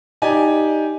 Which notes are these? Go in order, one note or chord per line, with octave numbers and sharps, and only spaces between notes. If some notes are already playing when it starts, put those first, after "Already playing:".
D#4 G4 D5 G#5